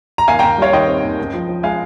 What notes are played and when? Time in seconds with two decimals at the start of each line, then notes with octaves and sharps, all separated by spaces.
0.18 A#5
0.28 D#2 F5 G#5
0.39 D#2 G5 A#5
0.58 G3 C#5 F5
0.73 D#3 D#5 G5
0.88 C4
1.03 D#2
1.19 C#2
1.34 F3
1.48 F3
1.63 G#3 F5 G#5